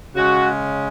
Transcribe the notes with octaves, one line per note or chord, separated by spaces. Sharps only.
C#3 G#3 C#4 F#4